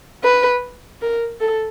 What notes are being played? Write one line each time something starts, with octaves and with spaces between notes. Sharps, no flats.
B4
A#4
A4